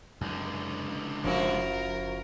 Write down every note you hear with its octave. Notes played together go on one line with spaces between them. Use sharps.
C#2 F#2 D3
F#1 F3 C#4 E4 F#4 A#4